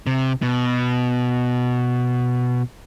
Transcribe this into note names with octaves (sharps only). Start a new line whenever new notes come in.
C3
B2